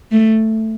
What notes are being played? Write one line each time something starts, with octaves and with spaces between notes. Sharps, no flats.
A3